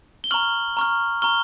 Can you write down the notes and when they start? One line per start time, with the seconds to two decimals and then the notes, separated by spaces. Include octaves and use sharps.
0.24 G7
0.31 A#5 C#6 F6 F#7
0.77 A#5 C#6 F6
1.22 A#5 C#6 F6 G7